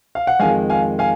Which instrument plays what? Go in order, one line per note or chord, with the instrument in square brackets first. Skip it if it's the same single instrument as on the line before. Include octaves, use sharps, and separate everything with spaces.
[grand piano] F5
F#5
F2 D#3 G#3 F5 G#5
F5 G#5
F5 G#5